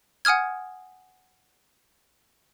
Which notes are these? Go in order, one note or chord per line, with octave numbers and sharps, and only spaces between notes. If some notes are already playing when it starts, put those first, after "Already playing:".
F#5 G#5 D#6 F6 G#6